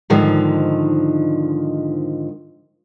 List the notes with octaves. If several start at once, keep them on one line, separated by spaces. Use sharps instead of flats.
G#2 D3 D#3 F3